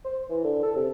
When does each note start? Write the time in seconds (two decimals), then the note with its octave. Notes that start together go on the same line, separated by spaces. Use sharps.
0.05 C5
0.30 E3
0.44 D3
0.63 A4
0.76 C3